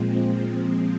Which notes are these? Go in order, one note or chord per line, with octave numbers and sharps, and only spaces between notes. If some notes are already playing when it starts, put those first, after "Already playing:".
Already playing: A#2 F3 G#3 C4